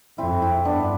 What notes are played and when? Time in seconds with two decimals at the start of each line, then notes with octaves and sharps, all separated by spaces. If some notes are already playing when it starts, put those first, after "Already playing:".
0.18 F2 C4 E4
0.42 C4 E4
0.65 G2 B3 D4
0.80 D4